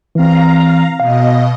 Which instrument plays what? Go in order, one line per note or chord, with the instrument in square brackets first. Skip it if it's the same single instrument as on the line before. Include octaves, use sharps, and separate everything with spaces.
[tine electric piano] E3 C4 [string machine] F5 A#5
[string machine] B2 D#5 [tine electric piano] F5